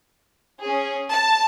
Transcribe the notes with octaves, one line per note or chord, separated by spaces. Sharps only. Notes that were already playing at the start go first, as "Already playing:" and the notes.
C#4 G#4
A5